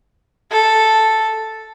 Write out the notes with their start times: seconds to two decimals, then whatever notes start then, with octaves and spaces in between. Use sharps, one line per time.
0.51 A4